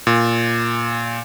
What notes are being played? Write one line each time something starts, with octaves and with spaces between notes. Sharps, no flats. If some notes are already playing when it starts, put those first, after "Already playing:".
A#2